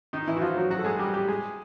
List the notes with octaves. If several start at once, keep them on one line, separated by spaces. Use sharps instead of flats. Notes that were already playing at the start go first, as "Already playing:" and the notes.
D#3 D#4
E3 E4
F#4
F3 F4
F#3 F#4
F#3 F#4
A4
G#3 G#4
G3 G4
G3 G4
G#3 G#4